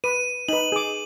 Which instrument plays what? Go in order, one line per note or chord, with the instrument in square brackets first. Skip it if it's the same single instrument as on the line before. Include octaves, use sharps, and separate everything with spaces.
[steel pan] B4 [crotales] D#7
[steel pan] D#4 B4 [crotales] F#7
[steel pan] G#4 D6